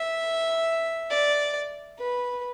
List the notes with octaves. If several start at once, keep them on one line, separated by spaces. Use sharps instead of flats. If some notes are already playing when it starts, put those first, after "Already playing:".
Already playing: E5
D5
B4